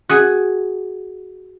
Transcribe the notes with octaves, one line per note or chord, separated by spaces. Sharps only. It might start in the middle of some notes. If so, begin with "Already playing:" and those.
F#4 G#4 G#5